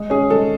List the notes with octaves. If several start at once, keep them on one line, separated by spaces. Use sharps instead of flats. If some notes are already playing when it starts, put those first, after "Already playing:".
Already playing: G#3
C#4 G#4
G#3 A4